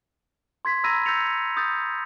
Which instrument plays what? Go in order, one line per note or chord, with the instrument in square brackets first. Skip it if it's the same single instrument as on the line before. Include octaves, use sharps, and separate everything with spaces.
[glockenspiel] C6 G#6 B6
A#5 B5 E6 G#6 A#6 D#7
E6 G6 A6 A#6 C#7 F7
D#6 G6 A6